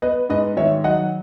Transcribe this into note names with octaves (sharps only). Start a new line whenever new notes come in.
B3 B4 D#5
G#2 B4 D#5
D#3 C#5 E5
F#3 D#5 F#5